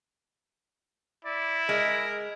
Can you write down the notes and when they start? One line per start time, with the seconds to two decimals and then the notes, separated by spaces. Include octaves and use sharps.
1.25 E4 D5
1.69 G#3 A#4